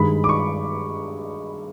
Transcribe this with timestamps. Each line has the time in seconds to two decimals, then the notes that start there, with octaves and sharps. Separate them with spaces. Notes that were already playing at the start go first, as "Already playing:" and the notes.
Already playing: G2 D#3 G#3 B5
0.24 D6
0.29 C#6